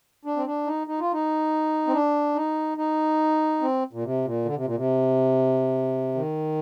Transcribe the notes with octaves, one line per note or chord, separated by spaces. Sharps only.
D4
C4
D4
D#4
D#4
F4
D#4
C4
D4
D#4
D#4
C4
A#2
C3
A#2
D3
C3
A#2
C3
D#3